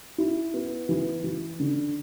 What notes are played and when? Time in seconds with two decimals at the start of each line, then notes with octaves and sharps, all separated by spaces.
0.18 E4
0.54 B3
0.89 E3
1.24 E3
1.60 D3